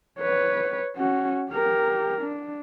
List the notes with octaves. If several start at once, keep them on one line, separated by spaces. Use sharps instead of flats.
B4 C#5
C#4 F#4
G4 A#4
D4